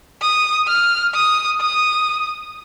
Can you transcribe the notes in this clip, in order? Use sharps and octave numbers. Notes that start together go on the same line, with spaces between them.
D#6
F6
D#6
D#6